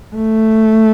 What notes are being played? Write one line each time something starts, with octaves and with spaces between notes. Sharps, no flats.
A3